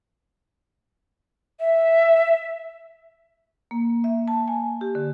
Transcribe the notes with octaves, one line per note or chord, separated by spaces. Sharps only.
E5
A#3
E5
A5
G#5
G4
D3